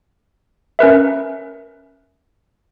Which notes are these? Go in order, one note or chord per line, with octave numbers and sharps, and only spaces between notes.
C#4 A#4 B4 E5